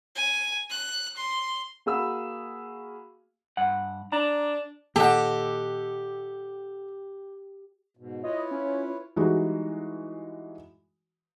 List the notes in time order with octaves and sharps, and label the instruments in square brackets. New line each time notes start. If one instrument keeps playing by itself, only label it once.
[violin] G#5
F#6
C6
[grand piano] A#3 F#4 G#4 F5 B5 E6
[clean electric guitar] G2 F#5
[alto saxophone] D4 [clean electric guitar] A#5
[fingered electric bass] A#2 D#3 A#3 [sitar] G4 [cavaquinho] A4 D#5 F#5
[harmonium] G#2 B2
[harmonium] E4 B4 C#5 [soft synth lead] F4 [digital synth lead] D#5
[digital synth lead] C#4
[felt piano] E3 G3 G#3 D#4 F#4